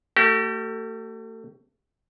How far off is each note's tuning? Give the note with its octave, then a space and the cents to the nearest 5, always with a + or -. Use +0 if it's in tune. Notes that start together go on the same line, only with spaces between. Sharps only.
A3 +35 G4 -40